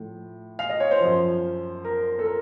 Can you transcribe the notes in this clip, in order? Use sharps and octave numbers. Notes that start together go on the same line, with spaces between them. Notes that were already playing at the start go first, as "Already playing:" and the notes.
Already playing: A2 F3
F5
D#5
C#5
C5
F#2 F3
A#4
A4
A#4